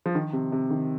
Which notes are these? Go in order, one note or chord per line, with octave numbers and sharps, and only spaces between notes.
F3
D#3
C3
C3
D#3